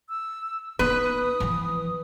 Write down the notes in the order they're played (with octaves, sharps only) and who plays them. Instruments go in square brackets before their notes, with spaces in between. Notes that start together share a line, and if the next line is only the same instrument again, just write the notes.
[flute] E6
[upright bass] B3 D#4 [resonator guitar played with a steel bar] B4 [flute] D#6
[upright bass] E3 F3